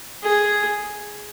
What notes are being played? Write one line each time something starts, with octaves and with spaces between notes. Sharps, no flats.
G#4